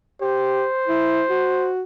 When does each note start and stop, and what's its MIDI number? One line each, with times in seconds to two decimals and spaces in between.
0.21 0.66 67
0.21 1.70 72
0.87 1.24 64
1.28 1.83 66